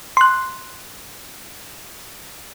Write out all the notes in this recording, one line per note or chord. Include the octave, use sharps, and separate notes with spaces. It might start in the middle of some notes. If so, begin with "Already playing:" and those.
C6 F#6